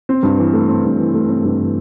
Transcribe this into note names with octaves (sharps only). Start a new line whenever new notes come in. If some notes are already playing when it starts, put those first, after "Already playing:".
C4
G2
E3
A3
C4
G2
E3
A3
C4
G2
E3